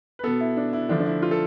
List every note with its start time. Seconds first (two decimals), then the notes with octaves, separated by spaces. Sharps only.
0.19 B4
0.24 B2 B3 A4
0.41 E4
0.57 D4
0.73 E4
0.89 D3 F3 A3 D4
1.00 D4
1.06 E4
1.22 F4
1.31 A4